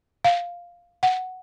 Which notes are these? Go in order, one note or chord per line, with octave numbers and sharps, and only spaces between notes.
F5
F#5